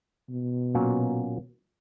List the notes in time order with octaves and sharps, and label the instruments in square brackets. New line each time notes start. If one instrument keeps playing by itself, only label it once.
[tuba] B2
[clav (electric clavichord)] A#2 F#3 A#3 C#4